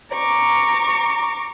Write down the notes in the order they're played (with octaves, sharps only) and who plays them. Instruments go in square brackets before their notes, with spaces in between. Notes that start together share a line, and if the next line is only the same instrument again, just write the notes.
[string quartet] A#5 C#6 D6